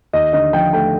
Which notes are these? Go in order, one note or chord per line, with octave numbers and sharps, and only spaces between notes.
D#2 D#5
D3 D#5
F3 G5
A3 G5